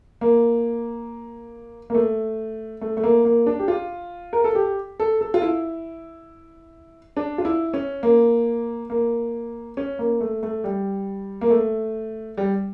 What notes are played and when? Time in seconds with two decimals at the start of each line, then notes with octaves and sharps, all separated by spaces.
0.21 A#3
1.90 A#3
1.95 A3
2.81 A3
2.97 A3
3.04 A#3
3.25 A#3
3.46 D4
3.59 G4
3.68 F4
4.33 A#4
4.44 A4
4.55 G4
5.00 A4
5.21 A4
5.34 F4
5.42 E4
7.17 D4
7.38 F4
7.45 E4
7.74 C#4
8.03 A#3
8.90 A#3
9.77 C#4
9.99 A#3
10.21 A3
10.43 A3
10.64 G3
11.41 A#3
11.50 A3
12.38 G3